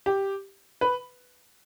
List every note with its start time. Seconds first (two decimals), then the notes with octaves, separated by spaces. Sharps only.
0.06 G4
0.81 B4